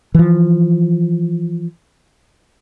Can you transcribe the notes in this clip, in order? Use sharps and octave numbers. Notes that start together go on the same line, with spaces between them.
E3 F3